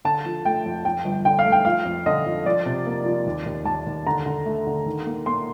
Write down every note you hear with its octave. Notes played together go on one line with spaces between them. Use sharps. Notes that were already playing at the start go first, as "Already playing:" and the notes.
D3 A5
F3
A3 G5
F2
F2 G5
G1
D3 G5
F5
A3
G5
F3 F5
F2
D3 D#5
F2
F3 D5
C3
A#3
F3
D#2
D#2
D#2 A5
D#2
D3 A#5
D3
A3
D3
D#3
A#3
A#3 C6